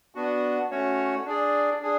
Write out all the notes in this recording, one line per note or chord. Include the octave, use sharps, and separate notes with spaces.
B3 D4 F#4
A3 C#4 F#4 C#5
D4 G#4 D5
D4 G#4